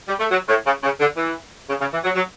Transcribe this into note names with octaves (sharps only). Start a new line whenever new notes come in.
G3
A3
F#3
A2
C#3
C#3
D3
E3
C#3
C#3
E3
F#3
F#3